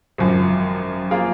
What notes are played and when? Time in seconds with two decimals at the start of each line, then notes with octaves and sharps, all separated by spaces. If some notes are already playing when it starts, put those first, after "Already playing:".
0.18 G#1 F#2 F3
1.11 F3 A#3 F4 G#4